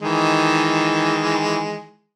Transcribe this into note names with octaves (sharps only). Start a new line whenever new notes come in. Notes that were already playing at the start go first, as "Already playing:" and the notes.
D#3 E3 G#3